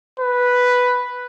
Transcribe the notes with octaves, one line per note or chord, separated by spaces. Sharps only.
B4